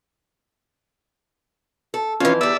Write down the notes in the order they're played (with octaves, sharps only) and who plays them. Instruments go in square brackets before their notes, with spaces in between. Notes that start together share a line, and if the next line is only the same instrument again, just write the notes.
[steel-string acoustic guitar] A4
[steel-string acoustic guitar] F2 E3 [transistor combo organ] C#4 F4
[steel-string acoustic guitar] E2 G3 [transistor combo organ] D5 E5 E6